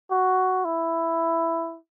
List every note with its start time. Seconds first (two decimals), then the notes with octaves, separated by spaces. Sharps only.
0.11 F#4
0.65 E4